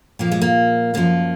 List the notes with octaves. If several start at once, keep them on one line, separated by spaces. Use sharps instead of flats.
A#2 F3 A#3
G#3
A#3
F#2 F3 A#3